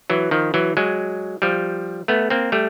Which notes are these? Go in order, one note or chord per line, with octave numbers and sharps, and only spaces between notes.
E3 F#3
D#3 F3
E3 F#3
F#3 G#3
F3 G3
A3 B3
A#3 C4
G3 A3